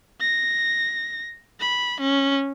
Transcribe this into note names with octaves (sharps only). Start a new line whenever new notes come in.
A#6
B5
C#4